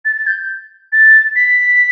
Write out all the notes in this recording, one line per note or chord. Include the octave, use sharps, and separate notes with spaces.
A6
A6
G6
A6
B6